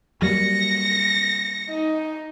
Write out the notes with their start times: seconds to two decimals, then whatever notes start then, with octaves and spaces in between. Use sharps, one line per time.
0.22 F#3 G3 A#3 A#6 C#7
1.70 D#4